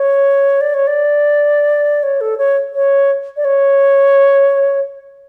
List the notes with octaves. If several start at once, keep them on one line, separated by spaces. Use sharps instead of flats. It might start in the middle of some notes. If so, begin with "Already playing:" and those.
Already playing: C#5
D5
C#5
D5
C#5
A4
C#5
C#5
D5
C#5